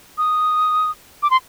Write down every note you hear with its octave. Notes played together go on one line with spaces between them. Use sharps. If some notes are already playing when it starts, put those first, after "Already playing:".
D#6
D6
C6